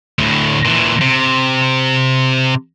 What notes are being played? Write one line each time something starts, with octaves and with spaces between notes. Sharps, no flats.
D2 A2
A#2 E3
C3